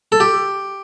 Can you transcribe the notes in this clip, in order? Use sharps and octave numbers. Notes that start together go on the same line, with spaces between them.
A4
G4